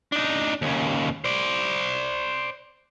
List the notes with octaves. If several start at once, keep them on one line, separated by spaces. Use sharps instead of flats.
D4 D#4
D#2 C#3
C5 D5